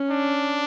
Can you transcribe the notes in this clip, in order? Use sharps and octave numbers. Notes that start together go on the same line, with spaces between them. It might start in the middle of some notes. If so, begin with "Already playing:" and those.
Already playing: C#4
D4